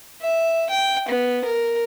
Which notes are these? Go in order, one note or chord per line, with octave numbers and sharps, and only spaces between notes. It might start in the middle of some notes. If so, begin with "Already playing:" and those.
E5
G5
B3
A#4